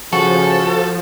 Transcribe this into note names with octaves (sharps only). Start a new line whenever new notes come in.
C#3 F3 F#4 A4